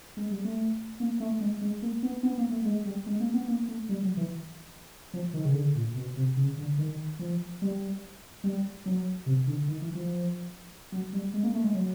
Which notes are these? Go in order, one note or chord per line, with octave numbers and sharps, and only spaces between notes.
G#3
G3
A3
A#3
A3
G#3
G#3
A#3
B3
B3
A#3
A3
G#3
G3
G#3
A#3
B3
A#3
A3
G3
F#3
E3
F3
D#3
C#3
D3
A#2
B2
C3
C#3
D3
D#3
F3
G3
G3
F#3
C3
D3
D#3
E3
F3
F#3
G3
G#3
A#3
A3
G#3
F#3